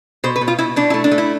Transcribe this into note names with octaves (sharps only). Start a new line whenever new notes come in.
B2 C5
B4
B2
F4
B2 E4
B2 D4
A3 E4
D4
A3
E4